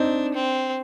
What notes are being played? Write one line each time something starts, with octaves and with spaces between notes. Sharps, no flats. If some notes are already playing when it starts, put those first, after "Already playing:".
Already playing: C4 D4 D#4
C4